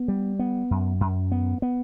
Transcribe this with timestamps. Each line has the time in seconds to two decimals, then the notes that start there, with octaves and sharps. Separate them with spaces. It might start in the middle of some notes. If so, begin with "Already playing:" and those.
Already playing: B3
0.08 G3
0.39 B3
0.71 F#2
1.01 F#2
1.32 B3
1.62 B3